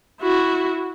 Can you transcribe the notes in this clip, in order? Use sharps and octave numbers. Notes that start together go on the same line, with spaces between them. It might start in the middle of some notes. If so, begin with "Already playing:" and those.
E4 F#4